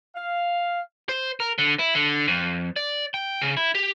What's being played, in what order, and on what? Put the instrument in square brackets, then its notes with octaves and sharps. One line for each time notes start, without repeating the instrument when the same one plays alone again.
[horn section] F5
[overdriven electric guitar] C5
A#4
D3
E4
D3
F2
D5
G5
C#3
E4
G4